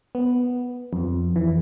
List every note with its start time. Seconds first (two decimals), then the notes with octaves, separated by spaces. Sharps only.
0.15 B3
0.93 F2
1.36 E3